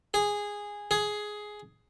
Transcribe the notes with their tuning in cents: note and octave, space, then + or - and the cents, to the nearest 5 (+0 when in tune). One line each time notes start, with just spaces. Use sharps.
G#4 -10
G#4 +10